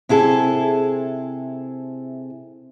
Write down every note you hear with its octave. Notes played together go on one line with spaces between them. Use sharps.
C3 E4 G#4 A4